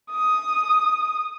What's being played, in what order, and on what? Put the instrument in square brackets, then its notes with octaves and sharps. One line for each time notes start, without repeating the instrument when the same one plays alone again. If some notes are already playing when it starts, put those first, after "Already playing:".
[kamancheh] D#6